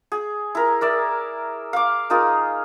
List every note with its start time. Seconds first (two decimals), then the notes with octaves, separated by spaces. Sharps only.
0.12 G#4
0.55 E4 A#4
0.81 A#4 D5 E5
1.73 F5 D6
2.10 A#3 D#4 F4 G#4